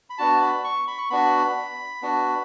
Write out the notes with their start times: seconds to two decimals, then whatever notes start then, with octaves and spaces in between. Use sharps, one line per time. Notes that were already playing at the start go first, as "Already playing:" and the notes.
0.10 B5
0.18 B3 D4 F#4 A5
0.42 B5
0.64 C#6
0.88 B5
0.98 C#6
1.10 B3 D4 F#4 B5
2.02 B3 D4 F#4